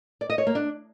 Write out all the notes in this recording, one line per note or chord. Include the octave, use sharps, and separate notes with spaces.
D5
D#5
C#5
A#3
D4